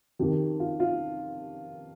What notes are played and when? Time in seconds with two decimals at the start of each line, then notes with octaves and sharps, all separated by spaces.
0.19 F2 D#3 G4
0.60 F4
0.80 F4